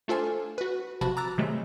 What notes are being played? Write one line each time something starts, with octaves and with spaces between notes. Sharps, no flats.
A3 D4 F4 A4 C5 G#5
F#4 B4
G1 C3 F3 F#4 A5 B5
A#5 D6 E6 F#6 A6
C3 D#3 F#3 G#3 A3